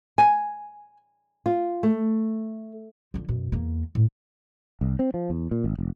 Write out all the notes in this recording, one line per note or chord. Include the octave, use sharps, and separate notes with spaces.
G#5
F4
A3
D3 F3
F#2 B2
E2 A#3
A2
C2
C4
F3
E2
A#2
G#1
F1